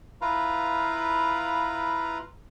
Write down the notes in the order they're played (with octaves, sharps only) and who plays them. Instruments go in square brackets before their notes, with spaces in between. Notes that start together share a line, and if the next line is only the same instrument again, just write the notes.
[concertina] E4 F4 B4 F5 A#5